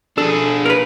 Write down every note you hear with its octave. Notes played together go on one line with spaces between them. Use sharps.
D4 G#4 A4
A#4 B4